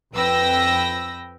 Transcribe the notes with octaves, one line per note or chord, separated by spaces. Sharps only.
F2 B4 G5 E6 A#6